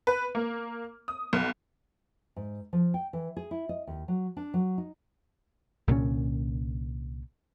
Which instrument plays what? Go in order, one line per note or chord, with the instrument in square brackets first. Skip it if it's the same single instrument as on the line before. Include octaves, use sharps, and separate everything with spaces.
[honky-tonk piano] B4
A#3
D#6
B1
[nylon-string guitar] G#2
F3
G5
E3
G#4
E4
D#5
D#2
F#3
D4
F#3
D#4
[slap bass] C2 A#2 D3 C#4